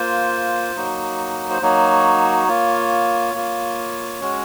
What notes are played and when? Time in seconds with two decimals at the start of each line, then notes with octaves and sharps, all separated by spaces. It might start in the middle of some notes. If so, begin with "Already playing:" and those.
Already playing: A#3 F4 C5
0.76 F#3 A#3 D#4 F#4
1.51 C5
1.62 F#3 A#3 D#4 F#4 C#5
2.48 A#3 F4
3.34 A#3 F4
4.21 G#3 C#4 F#4